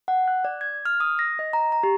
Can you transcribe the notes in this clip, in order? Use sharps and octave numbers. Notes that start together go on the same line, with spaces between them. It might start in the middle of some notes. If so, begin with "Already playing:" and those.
F#5
F#6
D5
G#6
F6
D#6
A#6
D#5
A#5
A#5
G4